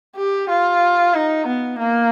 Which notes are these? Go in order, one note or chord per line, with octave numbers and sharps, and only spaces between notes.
G4
F4
D#4
B3
A#3